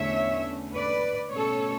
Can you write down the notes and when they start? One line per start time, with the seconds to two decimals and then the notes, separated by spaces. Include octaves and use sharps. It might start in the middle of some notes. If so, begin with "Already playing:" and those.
Already playing: E2 D3 A3 C#4 C#5 E5
0.76 B4 D5
1.33 B2 A3 C#4 A4 C#5